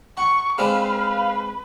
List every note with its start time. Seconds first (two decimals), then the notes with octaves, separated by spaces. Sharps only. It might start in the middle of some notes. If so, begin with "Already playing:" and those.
0.17 F#5 C#6
0.58 G#3 C4 D4 B4 F5